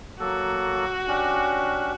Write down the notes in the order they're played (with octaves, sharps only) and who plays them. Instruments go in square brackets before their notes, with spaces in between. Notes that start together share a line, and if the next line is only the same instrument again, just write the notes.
[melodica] F#3 A#3 A4 [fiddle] F#4
[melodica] C#4 D4 G4